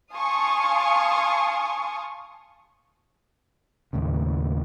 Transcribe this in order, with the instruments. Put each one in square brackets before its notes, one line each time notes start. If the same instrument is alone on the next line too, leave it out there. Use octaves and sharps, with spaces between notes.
[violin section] F5 G#5 A5 C6 C#6 D#6
[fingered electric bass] D#2 A2 C#3